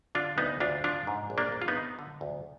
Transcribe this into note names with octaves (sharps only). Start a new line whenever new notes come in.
D3 D4 F4
D2 B3 D#4
D2 D4 F4
F3 D4 F4
G#2
A#1
A#3 D4
A#1
F4
B3 D#4
D#3
D3
D2